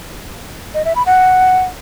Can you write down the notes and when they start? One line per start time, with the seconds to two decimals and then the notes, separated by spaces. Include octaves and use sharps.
0.74 D#5
0.85 E5
0.96 B5
1.06 F#5